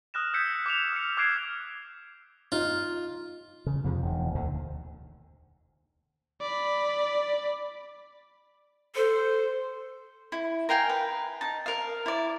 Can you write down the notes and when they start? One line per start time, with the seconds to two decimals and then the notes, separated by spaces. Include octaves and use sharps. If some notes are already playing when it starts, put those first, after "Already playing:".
0.14 D#6 F6 F#6 A#6 E7
0.34 E6 G6 G#6 B6 C#7 E7
0.66 D6 D#6 E7 F7
0.92 F6 C#7
1.17 D6 F6 F#6 G#6 C7 D7
2.52 D#4 F4
3.66 C#3
3.84 F2 C3 F3
4.03 E1 D#3
4.35 D2 A#2 D3
6.41 D5 B5
8.96 A4 C5
10.32 E4
10.69 A#4 F5 G5 G#5
10.89 B4
11.41 D#4 A5
11.66 A#4 F5
12.06 E4 D5